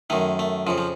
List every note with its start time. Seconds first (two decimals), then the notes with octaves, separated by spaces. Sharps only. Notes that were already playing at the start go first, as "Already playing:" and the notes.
0.10 F#2 D#3 A3
0.39 A3
0.67 F2 C#3 F3
0.78 F3